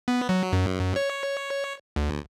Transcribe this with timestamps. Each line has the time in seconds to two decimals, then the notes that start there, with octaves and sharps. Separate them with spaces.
0.08 B3
0.29 F#3
0.53 F#2
0.96 C#5
1.96 D2